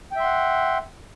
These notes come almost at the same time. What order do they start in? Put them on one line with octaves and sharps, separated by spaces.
G5 E5 C6 F#5